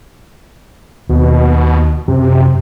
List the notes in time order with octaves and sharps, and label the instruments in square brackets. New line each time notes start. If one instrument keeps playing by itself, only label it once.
[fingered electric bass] D#2 [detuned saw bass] B2
[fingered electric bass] F#2 [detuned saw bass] C3